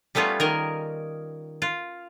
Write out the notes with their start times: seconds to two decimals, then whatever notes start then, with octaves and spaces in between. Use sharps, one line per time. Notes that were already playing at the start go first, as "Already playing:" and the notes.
0.15 G3 A3 B3 C#4 F4
0.40 D#3 A#4 D#5
1.62 F4